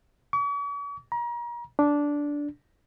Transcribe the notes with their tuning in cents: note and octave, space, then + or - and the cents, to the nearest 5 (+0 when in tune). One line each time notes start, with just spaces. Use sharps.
C#6 +45
A#5 +35
D4 -10